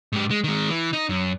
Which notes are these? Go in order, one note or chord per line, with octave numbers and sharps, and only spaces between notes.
G#2 G4
G#3
D#3 G#3
E3
D#4
F#2